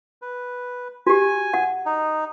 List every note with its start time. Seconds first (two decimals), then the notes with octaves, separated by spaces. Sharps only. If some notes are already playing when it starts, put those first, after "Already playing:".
0.22 B4
1.07 F#4 G4 G#5
1.54 F#5
1.86 D#4